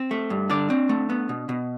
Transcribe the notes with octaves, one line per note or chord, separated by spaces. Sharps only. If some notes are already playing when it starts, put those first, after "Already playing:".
Already playing: C4
A3
G2
D3 D4 D5
C4
A3
B3
B2
B2